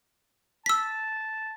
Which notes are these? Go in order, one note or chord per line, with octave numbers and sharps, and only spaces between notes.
A5 E6 B6